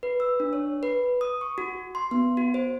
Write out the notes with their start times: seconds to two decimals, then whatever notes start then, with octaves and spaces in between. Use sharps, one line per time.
0.03 B4
0.20 E6
0.40 D4
0.53 C#5
0.83 B4
1.21 D#6
1.41 C#6
1.58 F#4
1.95 C6
2.11 B3
2.37 F#4
2.54 C5